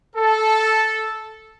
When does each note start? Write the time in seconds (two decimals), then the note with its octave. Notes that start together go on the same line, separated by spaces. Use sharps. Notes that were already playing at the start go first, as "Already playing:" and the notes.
0.15 A4